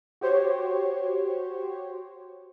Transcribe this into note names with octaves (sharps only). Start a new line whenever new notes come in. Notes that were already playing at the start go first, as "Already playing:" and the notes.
F#4 G4 C5 C#5